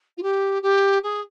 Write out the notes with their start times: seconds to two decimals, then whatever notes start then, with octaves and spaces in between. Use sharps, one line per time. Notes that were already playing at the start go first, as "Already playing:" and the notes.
0.17 F4
0.22 G4
0.62 G4
1.03 G#4